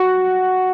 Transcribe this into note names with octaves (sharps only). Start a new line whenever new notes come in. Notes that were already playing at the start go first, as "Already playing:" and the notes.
Already playing: F#4